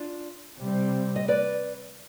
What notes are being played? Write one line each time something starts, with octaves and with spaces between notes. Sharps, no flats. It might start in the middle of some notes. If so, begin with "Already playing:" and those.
Already playing: D4 F4
C3 G3 C4
D#5
B4 D5